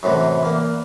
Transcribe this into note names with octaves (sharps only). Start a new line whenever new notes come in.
F#2 A2 C3 E3
E2 A#3